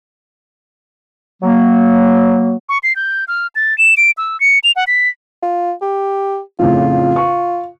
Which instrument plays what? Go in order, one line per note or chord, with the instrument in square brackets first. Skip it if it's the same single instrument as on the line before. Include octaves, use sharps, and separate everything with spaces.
[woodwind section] F#3 A#3
[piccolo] C#6
C7
G6
F6
A6
E7
D7
E6
C#7
F7
F#5
B6
[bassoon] F4
G4
[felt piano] F2 A2 C#3 [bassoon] F4
[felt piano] C#6